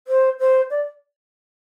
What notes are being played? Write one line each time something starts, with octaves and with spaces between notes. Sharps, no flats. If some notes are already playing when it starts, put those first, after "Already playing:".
C5
C5
D5